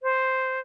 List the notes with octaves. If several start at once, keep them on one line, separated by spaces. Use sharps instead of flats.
C5